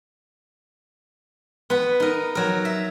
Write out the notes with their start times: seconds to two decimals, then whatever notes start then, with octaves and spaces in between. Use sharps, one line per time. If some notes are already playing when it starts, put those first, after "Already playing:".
1.70 B3 B4
2.00 D#4 A#4
2.35 F#3 A#4
2.65 E5